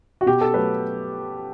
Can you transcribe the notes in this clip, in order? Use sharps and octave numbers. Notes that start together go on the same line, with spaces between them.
F#4
B2 G4
A4
F#3 A3 C#4 B4